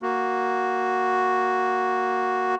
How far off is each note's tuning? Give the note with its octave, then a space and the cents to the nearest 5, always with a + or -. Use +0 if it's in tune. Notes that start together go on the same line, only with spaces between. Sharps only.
A#3 +0 F#4 +0